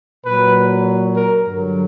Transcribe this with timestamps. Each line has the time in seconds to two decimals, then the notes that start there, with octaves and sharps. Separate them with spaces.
0.25 A#2 F#3 B4
1.16 A#4
1.46 G2 D3 F#3